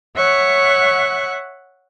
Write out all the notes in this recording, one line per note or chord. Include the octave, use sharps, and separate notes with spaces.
C#5 E5 F#5 C#6 F#6